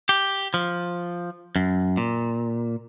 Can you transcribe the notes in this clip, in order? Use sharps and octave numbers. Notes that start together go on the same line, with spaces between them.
G4
F3
F#2
A#2